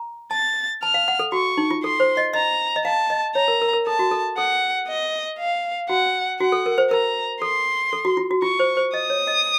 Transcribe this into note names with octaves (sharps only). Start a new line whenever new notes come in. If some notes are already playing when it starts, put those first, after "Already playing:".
Already playing: A#5
A5 A6
A5 F6
F5
F#5
A4
F#4 C#6
D#4
F4
A4 C6
C5
D#5
D#5 A#5
D#5
F5 A5
D#5
C#5 A#5
A#4
A#4
A#4
A4 A5
F#4
A4
A4 F#5
D#5
F5
F#4 F#5
F#4 F#5
A4
A#4
C5
A#4 A#5
A4 C6
A4
F#4
F4
F#4
F4 C#6
C5
C5
D#5 D#6
C#5
D#5